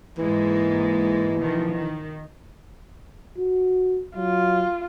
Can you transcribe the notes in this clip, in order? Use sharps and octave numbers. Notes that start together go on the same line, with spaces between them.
G#2 E3 G#3 A#3
B2 D#3 F3
D#3
F#4
F#3 F4